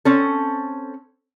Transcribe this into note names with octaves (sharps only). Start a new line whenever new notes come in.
C4 C#4 A4